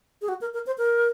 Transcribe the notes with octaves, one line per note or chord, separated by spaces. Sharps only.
G#4
F#4
A#4
A#4
C5
A#4